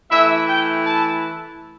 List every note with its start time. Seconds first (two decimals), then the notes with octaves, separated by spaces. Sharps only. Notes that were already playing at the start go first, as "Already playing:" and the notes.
0.11 E3 A3 E4 E5
0.48 G5
0.86 A5